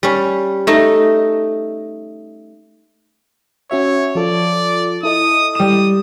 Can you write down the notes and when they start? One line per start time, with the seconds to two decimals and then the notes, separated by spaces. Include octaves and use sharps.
0.03 G3 C#4
0.67 A3 D#4 D#5
3.71 C#4 F#4 C#5 E5
4.15 F3 F4 A4 D5
5.03 E4 A4 D#5 D#6
5.55 G3 D#6 E7